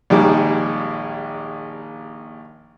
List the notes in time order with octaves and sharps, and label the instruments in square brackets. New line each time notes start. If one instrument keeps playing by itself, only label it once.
[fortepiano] A#1 D#2 D#3 G3 G#3